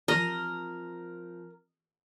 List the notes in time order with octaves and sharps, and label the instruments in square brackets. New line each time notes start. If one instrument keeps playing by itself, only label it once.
[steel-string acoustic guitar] F3 C4 [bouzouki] A#4 [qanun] D#5